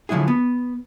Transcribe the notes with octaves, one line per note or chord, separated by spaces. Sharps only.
D3 F3 F#3 E4 G#4
B3